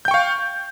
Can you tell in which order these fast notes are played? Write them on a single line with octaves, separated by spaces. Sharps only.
G6 G5 C#6 F5